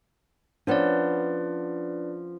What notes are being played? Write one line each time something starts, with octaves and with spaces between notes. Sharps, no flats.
F3 B3 C#4 D4 B4 D5